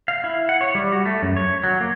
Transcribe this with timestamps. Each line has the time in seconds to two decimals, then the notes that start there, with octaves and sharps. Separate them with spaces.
0.08 F5
0.24 E4
0.49 F#5
0.61 C#5
0.75 G3
0.92 F#4
1.06 A3
1.22 F#2
1.36 C#5
1.64 F#3
1.81 A#3